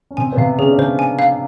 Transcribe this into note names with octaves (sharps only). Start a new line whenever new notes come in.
C#4
C3 C4 G#5
B3
C3 C4 F5
C#3 C#4 G#4
D4
C#3 C#4 C5
G#5
F5